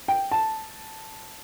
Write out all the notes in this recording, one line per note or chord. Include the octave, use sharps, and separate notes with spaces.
G5
A5